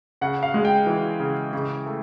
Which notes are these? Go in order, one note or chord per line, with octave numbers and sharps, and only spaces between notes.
C#3 F#5
F5
G#3
G5
E3
C#3
C#3
A3